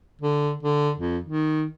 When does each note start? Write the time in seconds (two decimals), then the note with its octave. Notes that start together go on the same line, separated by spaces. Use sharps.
0.22 D3
0.63 D3
0.98 F2
1.24 D#3